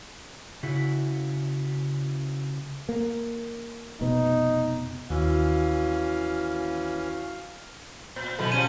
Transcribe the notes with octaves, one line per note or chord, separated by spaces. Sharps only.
C#3 E4 F#4
A#3
F1 B2 B3 D#4
D#2 E3 C#4 E4 F#4 F5
A#2 C5
B2 E3 F#3 G#3 B3 A4
F3 G3 C#4 D#7